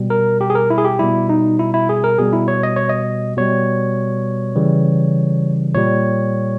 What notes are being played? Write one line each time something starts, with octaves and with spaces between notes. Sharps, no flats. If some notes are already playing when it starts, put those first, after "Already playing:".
Already playing: B2 G3
A#4
G4
G#4
A#4
E4
G#4
G4
B2 G3 E4
D#4
E4
E4
G#4
A#4
B2 G3 G#4
E4
C#5
D#5
C#5
D#5
B2 G3 C#5
C#3 E3 G3
A#2 G3 C#5